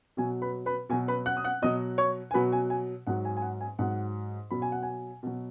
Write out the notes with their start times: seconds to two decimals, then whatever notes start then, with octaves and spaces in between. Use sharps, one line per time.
0.17 B2 F#3 G#5
0.42 B4 B5
0.66 B4 B5
0.89 B2 G#5
0.93 F#3
1.08 B4 B5
1.26 F#5 F#6
1.37 D#6
1.44 F#5 F#6
1.62 B2 F#3 D#5 D#6
1.98 C#5 C#6
2.31 G#5
2.34 B2 F#3 B4 B5
2.52 G#5
2.70 G#5
3.07 G#2 F#3 F#5
3.25 G#5
3.37 G#5
3.42 F#5
3.61 G#5
3.79 G#2 F#3 F#5
4.51 B2 F#3 B5
4.62 G#5
4.72 F#5
4.83 G#5
5.23 B2 F#3